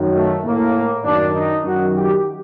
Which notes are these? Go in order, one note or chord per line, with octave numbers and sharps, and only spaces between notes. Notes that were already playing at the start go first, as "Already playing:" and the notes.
Already playing: F#2 D#3
A3
A2 A#3
F#2 D#3 D4
D#4
F#2 D#3 F#4
G4